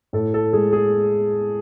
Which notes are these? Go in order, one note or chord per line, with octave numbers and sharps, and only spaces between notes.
A2 A4
A4
G#3 G#4
G#4